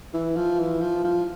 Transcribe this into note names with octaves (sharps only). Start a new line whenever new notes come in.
E3
F3
E3
F3
F3